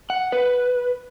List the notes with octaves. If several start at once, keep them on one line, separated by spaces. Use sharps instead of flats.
F#5
B4